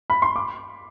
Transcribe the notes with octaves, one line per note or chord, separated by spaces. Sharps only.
B5
C6
D6